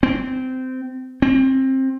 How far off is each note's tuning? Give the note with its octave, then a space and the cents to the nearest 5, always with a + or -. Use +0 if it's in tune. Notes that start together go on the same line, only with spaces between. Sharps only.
C4 -20
C4 +20